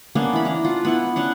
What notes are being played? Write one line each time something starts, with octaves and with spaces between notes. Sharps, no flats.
A#3 B3 C#4 D4
E3 B5
D4 A#5
F4 F#5
B3 E4 F#5
C#4 D4 F#5